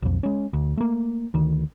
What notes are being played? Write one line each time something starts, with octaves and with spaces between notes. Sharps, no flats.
B1 F2
G#3 C#4
D2
A3 A#3
D2 D#3